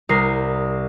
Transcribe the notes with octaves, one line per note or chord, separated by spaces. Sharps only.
C2 A#4 C7